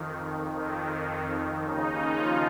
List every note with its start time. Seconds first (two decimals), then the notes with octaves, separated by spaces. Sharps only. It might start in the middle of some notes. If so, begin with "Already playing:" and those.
Already playing: F2 D#3
0.57 F2 D#3
1.65 D#2 C#3 D#4
2.18 F3 F4